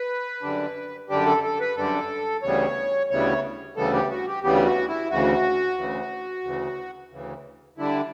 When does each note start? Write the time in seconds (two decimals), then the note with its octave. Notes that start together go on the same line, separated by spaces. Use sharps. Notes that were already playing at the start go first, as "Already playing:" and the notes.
Already playing: B4
0.43 F#2 D3 G3 D4
1.09 F#2 D3 G3 D4 G4
1.26 A4
1.43 A4
1.60 B4
1.76 F#2 D3 G3 D4 A4
2.43 D2 C#3 E3 G3 B3 C#5
3.10 D2 C#3 E3 G3 B3 C#5
3.77 D2 C#3 E3 G3 B3 A4
3.93 G4
4.11 F#4
4.27 G4
4.43 D2 C#3 E3 G3 B3 G4
4.65 F#4
4.88 E4
5.11 D2 C#3 E3 F#4
5.78 D2 C#3 E3
6.44 D2 C#3 E3
7.11 D2 C#3 E3
7.78 D3 G3 D4 E4